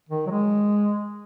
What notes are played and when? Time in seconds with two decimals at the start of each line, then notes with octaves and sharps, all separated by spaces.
0.09 D#3
0.26 F#3
0.30 G#3